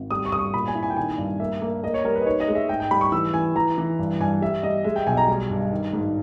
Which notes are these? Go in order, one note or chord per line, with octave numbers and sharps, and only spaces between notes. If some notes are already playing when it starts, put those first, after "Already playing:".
Already playing: G#1
G3 D#6
C#6
G2 D#6
C#6
A#2 B5
G#5
E4
G#5
G5
D#3 G#5
G2
A#3 E5
A#3
A#3 D#5
C#5
G3 A#4
B4
D#5
D#4 C#5
D#5
G#3
E5
G#2 G5
G5
G3 B5
C#6
E3 E6
E3 G#5
E3 A#5
E3
G2
G2 G#5
G3 E5
G3 D#5
G#3 E5
G5
B1 G#5
A#5
G3
G2
D#3
G#2